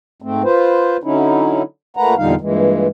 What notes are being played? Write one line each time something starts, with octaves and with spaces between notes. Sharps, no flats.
G#2 A3 C4
F4 B4 C5
D3 F#3 C#4 D#4 E4
A#2 A3 A#3 B4 F#5 A#5
E2 A#2 D3 G3 D#4 F5
G2 A#2 E3 G#3